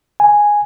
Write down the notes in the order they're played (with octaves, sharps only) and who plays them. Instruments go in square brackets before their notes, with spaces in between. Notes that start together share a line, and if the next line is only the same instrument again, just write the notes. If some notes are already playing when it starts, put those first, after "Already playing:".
[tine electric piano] G#5